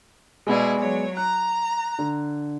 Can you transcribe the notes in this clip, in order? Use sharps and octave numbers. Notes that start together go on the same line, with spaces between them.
B2 G#3 B3 E4 G#4 D5
F#3 C#5
A#5 F#6
D3